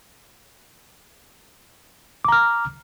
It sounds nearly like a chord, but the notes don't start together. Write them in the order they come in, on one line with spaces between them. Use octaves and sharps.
D6 A#5 F6